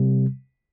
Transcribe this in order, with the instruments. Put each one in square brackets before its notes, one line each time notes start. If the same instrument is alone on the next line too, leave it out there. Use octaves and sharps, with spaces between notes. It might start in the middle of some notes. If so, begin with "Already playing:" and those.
Already playing: [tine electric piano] C3 G3